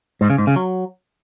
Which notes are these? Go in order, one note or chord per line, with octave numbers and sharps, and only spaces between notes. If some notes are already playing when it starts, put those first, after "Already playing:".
G#2
C#3
G#2
C#3
F#3